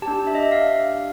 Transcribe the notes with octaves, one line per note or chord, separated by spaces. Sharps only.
G4 A5
D4
E5
D#5
E5
F5
F5